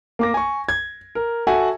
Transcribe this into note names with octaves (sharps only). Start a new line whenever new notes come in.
A#3 D6 A#6
G#5 C#6
G#6
A#4
F#4 A4 E5 F#5 G#5